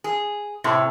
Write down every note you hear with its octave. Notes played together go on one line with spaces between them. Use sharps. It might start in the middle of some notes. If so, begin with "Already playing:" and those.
G#4
A2 C3